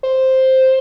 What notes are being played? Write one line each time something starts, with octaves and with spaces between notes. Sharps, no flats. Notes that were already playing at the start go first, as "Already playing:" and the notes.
C5